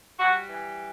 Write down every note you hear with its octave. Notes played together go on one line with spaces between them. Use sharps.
G3 F#4
E3